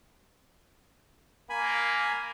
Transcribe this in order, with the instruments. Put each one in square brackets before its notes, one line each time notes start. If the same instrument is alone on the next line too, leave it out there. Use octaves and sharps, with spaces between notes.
[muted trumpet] A#3 [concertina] G#5 B5